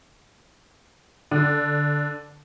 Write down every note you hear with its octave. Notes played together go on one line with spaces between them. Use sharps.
D3